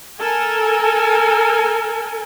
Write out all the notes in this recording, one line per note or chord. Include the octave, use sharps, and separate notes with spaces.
A4 A#4 G#5